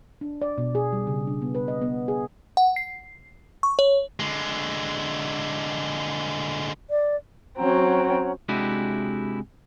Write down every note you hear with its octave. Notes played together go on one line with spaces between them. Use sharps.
D4
D5
B2
G#4
G3
C#3
D4
B3
B4
D#5
B3
G#4
F#5
C7
C#6
C#5
D3 G#3
D5
F#3 C4 C#4 F#5 A#5
C3 G#3 D4 E4 F#4 G4